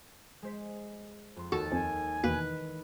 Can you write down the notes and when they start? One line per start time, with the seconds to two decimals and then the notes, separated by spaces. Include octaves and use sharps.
0.42 G#3 C5 B6
1.36 F2 C6
1.52 D#2 F#4 A4
1.72 F2 F3 G#5
2.24 E2 B2 D#3 E3 A#3 B4